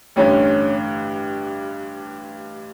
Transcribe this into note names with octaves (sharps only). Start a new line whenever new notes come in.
A1 G2 D3 C#4